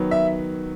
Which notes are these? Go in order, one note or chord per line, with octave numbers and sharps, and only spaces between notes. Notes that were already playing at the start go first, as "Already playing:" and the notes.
Already playing: D#3 F#3 B3
E5